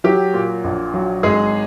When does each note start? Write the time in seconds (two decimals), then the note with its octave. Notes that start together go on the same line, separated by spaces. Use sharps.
0.04 F#3 G4
0.34 A#2
0.64 A#1
0.94 F#3
1.23 G#1 G#3 G#4